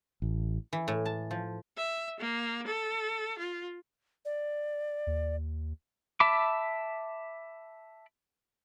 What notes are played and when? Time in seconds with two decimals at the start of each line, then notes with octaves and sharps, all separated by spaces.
0.22 A1
0.73 E3
0.88 A2
1.06 A5
1.31 F3
1.77 E5
2.20 A#3
2.67 A4
3.38 F4
4.25 D5
5.07 D#2
6.20 E5 A5 B5 D6